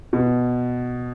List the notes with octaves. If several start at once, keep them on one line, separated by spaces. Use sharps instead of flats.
B2